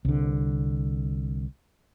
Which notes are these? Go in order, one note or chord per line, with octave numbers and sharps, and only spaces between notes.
C2 D3